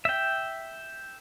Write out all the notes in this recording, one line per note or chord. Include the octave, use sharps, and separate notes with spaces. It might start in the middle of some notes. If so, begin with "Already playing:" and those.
E5 G5